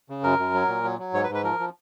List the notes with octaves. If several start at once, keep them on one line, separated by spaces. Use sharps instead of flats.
C#3
F#2 A#4
F#2
F#3
A#2
F#3
F#3
G#2 C#5
B4
G#2
B4
F3 A#4
F3